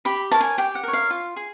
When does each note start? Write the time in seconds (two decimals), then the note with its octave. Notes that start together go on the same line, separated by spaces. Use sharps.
0.05 G4 B5
0.32 A#4 C#5 A5
0.41 G#5
0.58 G4 G5
0.75 F#5
0.83 A#4 C#5
0.93 F5
1.10 F4
1.36 G#4